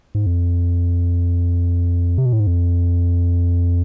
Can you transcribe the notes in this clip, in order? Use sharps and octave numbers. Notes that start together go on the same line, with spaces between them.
G#2
F2
C3
B2
A2
G#2
F2